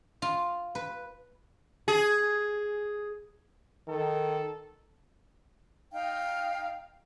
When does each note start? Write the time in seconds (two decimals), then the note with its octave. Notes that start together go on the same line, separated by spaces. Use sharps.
0.22 F4
0.75 B4
1.88 G#4
3.88 D#3 A4
5.92 D#4 F5 G5